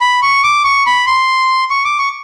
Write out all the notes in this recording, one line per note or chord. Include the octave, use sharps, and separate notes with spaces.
B5
C#6
D6
C#6
B5
C6
C#6
D6
C#6